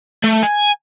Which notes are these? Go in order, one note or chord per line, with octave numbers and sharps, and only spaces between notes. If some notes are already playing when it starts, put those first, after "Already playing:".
A3
G#5